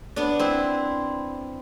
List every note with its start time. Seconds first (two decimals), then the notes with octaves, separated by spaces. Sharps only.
0.16 B3 D4
0.39 C4 E4